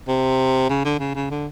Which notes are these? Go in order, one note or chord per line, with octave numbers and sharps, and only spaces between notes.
C3
C#3
D3
C#3
C#3
D3